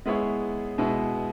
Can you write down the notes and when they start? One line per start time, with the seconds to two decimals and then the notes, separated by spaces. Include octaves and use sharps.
0.06 G#3 B3 E4 G#4 C#5
0.78 B2 G#3 B3 E4